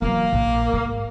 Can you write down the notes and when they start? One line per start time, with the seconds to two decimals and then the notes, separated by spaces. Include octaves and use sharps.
0.02 E3 F#3 A#3
0.33 A#1
0.73 G#2